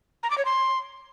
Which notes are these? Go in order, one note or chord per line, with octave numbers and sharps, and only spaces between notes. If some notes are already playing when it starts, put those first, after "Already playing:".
A#5
D6
C#5
C6